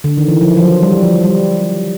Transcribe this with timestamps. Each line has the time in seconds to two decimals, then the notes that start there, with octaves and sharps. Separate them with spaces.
0.04 D3
0.17 D#3
0.28 E3
0.41 F3
0.57 F3
0.61 F#3
0.83 G3
1.03 F3
1.24 G3